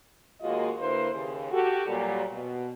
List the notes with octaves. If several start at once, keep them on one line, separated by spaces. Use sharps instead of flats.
D#2 G#3 A#3 F4 F#4 D#5
D3 A#3 E4 B4 C5
D#2 C#3
F#4 G4 A4
A#2 F#3 G3
B2